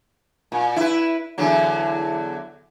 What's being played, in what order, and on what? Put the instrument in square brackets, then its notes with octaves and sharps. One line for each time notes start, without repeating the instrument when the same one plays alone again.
[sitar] A#2
E4 B4
E2 D3 F#3